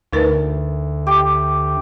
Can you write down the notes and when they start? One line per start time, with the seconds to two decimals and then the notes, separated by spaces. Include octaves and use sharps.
0.13 D2 D#4 A#4 B4
1.07 G4